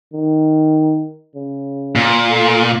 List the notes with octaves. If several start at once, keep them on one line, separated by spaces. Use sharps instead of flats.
D#3
C#3
A#2
A4